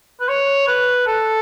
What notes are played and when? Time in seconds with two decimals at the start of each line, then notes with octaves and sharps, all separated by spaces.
0.20 B4
0.28 C#5
0.68 B4
1.07 A4